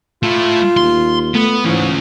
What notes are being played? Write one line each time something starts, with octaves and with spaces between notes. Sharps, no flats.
A3 E4 F4
D#2 C6
A3 B3
G#2 E3 C#4 F4